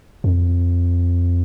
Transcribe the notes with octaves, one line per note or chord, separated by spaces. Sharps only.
F2